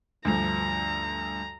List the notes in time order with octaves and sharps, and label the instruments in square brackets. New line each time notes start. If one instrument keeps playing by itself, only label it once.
[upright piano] D2 G2 F3 [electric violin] A#5